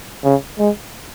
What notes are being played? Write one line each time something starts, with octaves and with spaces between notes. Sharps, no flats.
C#3
G#3